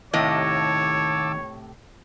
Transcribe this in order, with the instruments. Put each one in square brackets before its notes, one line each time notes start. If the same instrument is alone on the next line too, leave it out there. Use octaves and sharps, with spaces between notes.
[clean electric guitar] D#2 [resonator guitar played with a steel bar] A2 C3 D#5 [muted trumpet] C#5 [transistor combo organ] A5 D6 E6